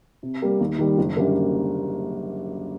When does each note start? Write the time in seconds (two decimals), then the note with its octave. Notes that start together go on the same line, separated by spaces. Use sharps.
0.23 C3
0.42 G3 A#3
0.60 D#2
0.79 D#3 G3
0.98 F#1
1.17 F#2 D3 G3 A#3